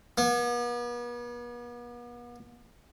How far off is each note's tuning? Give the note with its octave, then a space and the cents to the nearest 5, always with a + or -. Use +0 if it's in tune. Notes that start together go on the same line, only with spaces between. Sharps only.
B3 -40